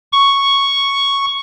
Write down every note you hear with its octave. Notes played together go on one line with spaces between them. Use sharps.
C#6